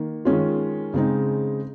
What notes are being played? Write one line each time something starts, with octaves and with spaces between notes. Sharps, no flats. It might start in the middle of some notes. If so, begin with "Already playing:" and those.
Already playing: D#3 A#3
D#3 G#3 C#4 F4
C#3 G#3 C4 D#4